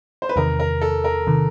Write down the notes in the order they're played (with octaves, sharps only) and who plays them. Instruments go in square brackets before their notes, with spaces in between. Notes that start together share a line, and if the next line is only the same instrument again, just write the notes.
[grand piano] C5
B4
[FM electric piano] E2 C3 D#3 [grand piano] A#4
[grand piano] A#4
A4
A#4
[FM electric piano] C3 D#3